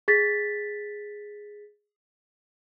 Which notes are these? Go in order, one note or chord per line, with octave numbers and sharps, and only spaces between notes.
G#4 A6 B6